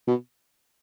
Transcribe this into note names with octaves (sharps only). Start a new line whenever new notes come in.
B2